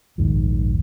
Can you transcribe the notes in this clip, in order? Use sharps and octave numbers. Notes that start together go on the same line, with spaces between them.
A#1 D#2 G#2